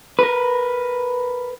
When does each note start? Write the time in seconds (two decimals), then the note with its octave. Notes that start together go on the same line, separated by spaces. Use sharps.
0.19 A#4 B4